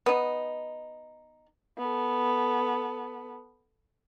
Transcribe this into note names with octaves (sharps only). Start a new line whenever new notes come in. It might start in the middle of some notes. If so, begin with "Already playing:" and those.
B3 D#4
B3 A4